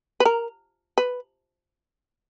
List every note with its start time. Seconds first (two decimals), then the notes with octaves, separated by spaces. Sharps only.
0.20 B4
0.25 A#4
0.98 B4